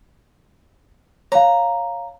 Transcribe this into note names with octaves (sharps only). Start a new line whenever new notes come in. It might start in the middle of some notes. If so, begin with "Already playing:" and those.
C#5 F5 A#5